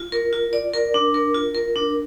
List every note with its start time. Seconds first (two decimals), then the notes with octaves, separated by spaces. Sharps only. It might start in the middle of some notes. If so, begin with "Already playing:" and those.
Already playing: F4
0.12 A#4
0.33 F4
0.53 D5
0.74 A#4
0.94 D4
1.14 A#4
1.35 F4
1.55 A#4
1.76 D4